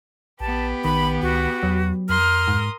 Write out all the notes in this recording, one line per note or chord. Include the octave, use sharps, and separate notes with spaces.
A#1 B3 G4 B4 A5
A#1 D#3 B5
C#2 F#4
E2 F#3
F2 A#4 C6 D#6 F6
G#2